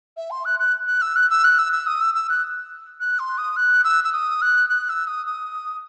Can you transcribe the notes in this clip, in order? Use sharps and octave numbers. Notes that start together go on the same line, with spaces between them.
E5
C6
F#6
F#6
F#6
E6
F#6
E6
F#6
E6
E6
D#6
E6
E6
F#6
F#6
C6
D#6
F#6
E6
E6
D#6
F#6
F#6
E6
D#6
D#6